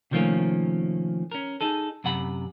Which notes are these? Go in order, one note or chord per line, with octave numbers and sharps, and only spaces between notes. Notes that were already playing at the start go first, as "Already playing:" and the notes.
C3 D#3 F3 A3 A#3 C#4
C#4 A#4
D#4 G#4 A4
F#2 C3 F#5 B5